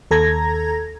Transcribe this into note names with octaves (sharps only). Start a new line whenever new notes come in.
D#2 A4 A#5 G#6 A#6